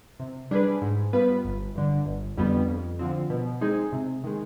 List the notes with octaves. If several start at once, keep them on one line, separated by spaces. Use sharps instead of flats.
C3
G3 D4 G#4 B4
G#2
G3 B3 F4 B4
G1
G2 D3
G1
F2 D3 G3 B3
F2
D3 F3 C4
B2
G#3 C4 D#4 G#4
C3
D#3 G#3